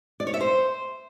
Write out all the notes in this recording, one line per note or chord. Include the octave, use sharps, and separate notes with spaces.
D5
C#5
E5
C5